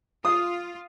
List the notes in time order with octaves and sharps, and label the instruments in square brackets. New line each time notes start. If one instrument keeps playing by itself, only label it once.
[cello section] F4 [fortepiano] D#6